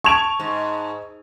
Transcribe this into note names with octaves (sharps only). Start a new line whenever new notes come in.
A5 C#6 G#6 D7 F7
G#2